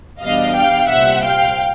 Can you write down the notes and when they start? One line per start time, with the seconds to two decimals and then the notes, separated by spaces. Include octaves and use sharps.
0.21 E2 B2 G3 B3 D4 D#5 F5
0.56 F5 G5
0.89 C2 A#2 G3 C4 E5 F#5
1.24 F5 G5